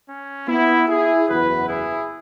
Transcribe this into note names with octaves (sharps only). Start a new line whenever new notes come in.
C#4
B3 E4
E4 G#4
F#1 E2 E3 B3 F#4 B4
E4 G#4